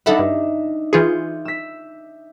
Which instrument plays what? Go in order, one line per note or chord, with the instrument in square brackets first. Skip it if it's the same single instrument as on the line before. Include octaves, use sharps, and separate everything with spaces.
[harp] D4 D#4 E5 [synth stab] A4 F#5 B5
[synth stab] G2
[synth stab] E3 F4 G#4 [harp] G6 C#7
[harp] E6 B6